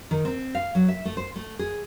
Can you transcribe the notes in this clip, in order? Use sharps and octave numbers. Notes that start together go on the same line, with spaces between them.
D#3
C4
F5
F#3
E5
A3
C5
A3
G#4